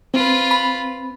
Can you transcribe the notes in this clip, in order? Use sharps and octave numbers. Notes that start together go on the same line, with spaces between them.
C4 F4 B4
B5